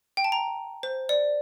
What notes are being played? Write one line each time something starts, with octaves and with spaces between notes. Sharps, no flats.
G5
A5
A#5
C5
D5